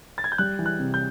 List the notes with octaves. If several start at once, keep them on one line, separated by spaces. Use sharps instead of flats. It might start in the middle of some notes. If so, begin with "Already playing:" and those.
A6
G#6
G6
G3 F#6
E3
F#6
C3
G6